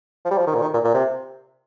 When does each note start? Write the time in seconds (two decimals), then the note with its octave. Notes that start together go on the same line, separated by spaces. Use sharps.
0.25 F3
0.31 G3
0.38 F3
0.47 D#3
0.55 A#2
0.62 D#3
0.74 A#2
0.85 A#2
0.94 C3